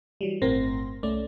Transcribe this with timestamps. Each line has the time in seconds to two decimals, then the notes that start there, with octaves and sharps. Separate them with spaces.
0.21 E3 F#3 G3
0.42 G1 A2 C4 A#4 C6 A#6
1.03 C2 A3 C#4 D5